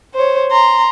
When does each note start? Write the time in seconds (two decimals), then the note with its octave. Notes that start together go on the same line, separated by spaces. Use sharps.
0.14 C5 C#5
0.51 A#5 C6